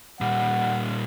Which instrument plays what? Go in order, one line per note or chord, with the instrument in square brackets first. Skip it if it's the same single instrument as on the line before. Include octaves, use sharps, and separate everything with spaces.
[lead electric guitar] A#2 G3 [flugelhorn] F#5